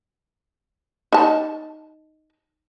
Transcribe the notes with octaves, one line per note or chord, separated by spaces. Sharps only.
D#4 A5